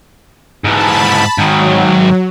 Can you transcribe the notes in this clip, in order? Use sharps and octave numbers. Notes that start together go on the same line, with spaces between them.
G#2 E3 A5 B5
G#2 D#3 F#3